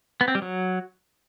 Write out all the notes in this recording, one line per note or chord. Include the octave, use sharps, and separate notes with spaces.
B3
C4
G3
F#3